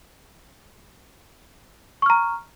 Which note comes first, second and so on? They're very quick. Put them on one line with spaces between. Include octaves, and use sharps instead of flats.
C#6 F6 A#5